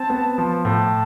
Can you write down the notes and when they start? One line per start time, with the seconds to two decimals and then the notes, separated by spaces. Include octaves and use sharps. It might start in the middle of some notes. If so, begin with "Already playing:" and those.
Already playing: C4 A5
0.10 B3
0.38 F3
0.65 A2 A5